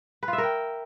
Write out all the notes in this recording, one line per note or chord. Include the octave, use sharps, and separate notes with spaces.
B4
F4
E5
A#4
G5